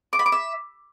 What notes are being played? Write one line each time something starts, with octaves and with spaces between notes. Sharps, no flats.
D6
B5
D6
E5